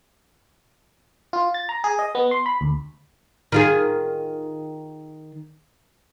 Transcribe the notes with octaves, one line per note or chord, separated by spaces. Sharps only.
F4
A6
A#5
G#4
D#5
B3
C6
B5
D2
D#3 F4 G#4